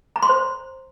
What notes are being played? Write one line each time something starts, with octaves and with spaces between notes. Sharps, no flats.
A#5
C6
C5